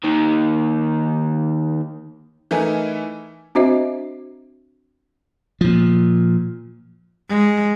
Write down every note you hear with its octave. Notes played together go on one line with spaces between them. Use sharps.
D#2 D#3
E3 A3 D#4 E4 A#4 G#5
C4 D4 F#4 C5 D#5 E5
A#2 F3
G#3